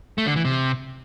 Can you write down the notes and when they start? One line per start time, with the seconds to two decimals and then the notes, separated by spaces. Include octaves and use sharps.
0.18 A3
0.27 D3
0.36 E3
0.45 C3